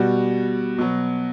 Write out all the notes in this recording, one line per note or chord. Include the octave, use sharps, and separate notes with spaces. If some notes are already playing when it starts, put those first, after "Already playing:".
Already playing: B2 G3 F#4
B2 F#3